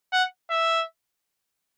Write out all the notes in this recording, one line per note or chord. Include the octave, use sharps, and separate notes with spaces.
F#5
E5